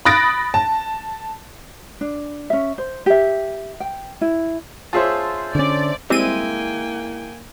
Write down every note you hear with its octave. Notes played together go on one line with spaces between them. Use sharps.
B5 D#6 F#6 A6 A#6 D7
A5
D4
C#4 E5
C5
G4 E5
G5
E4
F4 G#4 C5 C#5 E5 A5
D3 C#4 D5
G3 G#3 A#3 C4 E4 G5 G#5 D#7